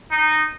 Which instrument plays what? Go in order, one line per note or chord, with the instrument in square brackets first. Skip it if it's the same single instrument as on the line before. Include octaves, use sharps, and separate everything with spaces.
[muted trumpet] D#4